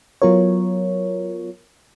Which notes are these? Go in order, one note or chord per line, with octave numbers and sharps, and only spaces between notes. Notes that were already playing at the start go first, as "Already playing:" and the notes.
F#3 B3 F4 A#4 C#5